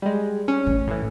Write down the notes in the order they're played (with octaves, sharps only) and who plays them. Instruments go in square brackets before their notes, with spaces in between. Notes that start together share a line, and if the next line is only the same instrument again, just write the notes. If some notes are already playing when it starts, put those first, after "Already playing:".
[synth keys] G3 G#3
C#4
[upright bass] A1
[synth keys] A2 E3